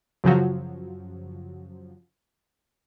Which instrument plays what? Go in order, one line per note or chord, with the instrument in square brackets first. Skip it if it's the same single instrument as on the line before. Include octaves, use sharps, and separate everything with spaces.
[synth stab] F#2 C#3 F3 F#3